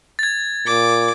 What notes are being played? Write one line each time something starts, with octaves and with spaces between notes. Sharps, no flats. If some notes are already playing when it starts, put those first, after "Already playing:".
G#6 A6
A#2 D6